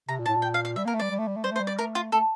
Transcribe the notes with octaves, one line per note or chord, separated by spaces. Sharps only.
C3 A#5
A#2
A2 A5
A#2
G5
F5
F5
G3 E5
A#3 A#4
A3
G3 D5
G3
A3
G3
A3
G3 C5
A3
C5
G3
D5
A3 A#4
F4
A3 A4